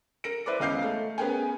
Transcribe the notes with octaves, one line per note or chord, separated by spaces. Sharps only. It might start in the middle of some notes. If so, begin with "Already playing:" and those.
A#4 A#6 D7
E4 B4 C5 D5 D6
E1 C#3 D#5 F5 G6 C7
A3
B3 C#4 G#4 A#4 G5 G#5